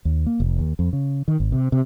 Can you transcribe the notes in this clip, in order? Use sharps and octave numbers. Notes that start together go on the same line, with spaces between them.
D#2
A#3
F1
D#2
F2
C#3
D#3
G#1
C3
C3